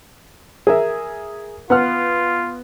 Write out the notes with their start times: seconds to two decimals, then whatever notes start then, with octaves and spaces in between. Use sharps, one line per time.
0.67 G#4 A#4 E5
1.70 B3 F4 F#5 F6